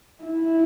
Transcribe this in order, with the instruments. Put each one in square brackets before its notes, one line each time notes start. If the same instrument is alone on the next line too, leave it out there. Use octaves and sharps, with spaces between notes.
[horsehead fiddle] E4